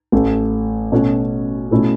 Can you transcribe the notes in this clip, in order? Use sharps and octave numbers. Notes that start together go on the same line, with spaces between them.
A1 A2 A3
B2 A3 C#4 F#4
B2 A3 C#4 E4 A4